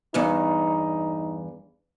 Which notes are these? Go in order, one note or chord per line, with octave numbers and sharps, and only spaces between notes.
E2 G2 D#4